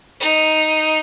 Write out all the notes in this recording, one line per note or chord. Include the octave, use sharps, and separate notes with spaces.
D#4